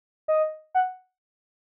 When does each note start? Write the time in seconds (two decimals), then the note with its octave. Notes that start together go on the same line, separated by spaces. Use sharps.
0.28 D#5
0.75 F#5